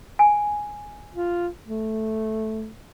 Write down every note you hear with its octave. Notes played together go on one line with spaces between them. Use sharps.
G#5
F4
A3